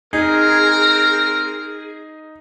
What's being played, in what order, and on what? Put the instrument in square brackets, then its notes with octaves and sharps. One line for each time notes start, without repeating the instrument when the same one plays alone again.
[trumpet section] C4 A#4 [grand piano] D#4 [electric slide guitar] G#4